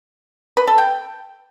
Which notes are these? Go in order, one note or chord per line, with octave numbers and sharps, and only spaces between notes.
B4
A4
G5